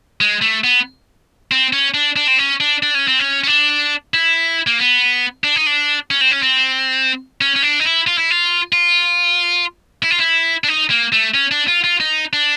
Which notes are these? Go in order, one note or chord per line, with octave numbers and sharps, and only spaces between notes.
G#3
A3
B3
C4
C#4
D4
D4
C4
C#4
D4
D4
C#4
C4
C#4
C#4
D4
E4
A#3
B3
D4
D#4
D4
C#4
C4
C#4
C4
C#4
C#4
D4
D#4
E4
F4
E4
F4
F4
E4
F4
E4
D4
D#4
A#3
A3
C#4
D4
F4
F4
D#4
D4